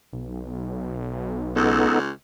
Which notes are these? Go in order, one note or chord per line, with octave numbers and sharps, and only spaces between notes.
B1
C#2 B3 D#4 A4